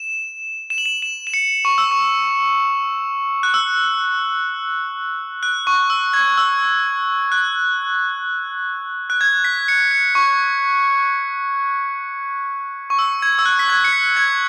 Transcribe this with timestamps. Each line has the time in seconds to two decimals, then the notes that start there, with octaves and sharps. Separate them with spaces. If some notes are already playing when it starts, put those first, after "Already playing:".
Already playing: E7
0.70 E7
0.78 F#7
0.86 E7
1.02 E7
1.27 E7
1.34 C#7
1.65 C#6
1.78 E6
1.91 C#6
3.43 F#6
3.54 E6
5.43 F#6
5.67 C#6
5.90 E6
6.14 G#6
6.37 E6
7.32 F#6
9.10 F#6
9.21 G#6
9.44 B6
9.68 C#7
9.91 C#7
10.15 C#6
12.90 C#6
12.99 E6
13.22 G#6
13.39 E6
13.46 F#6
13.59 B6
13.70 G#6
13.84 C#7
13.93 B6
14.17 G#6